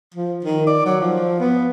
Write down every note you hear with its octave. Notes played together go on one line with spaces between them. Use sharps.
F3
D#3
D5
F#3
F3
B3